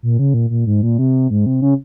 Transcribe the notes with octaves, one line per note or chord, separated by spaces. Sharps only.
A#2
C#3
A#2
A#2
G#2
A#2
C3
G#2
C3
C#3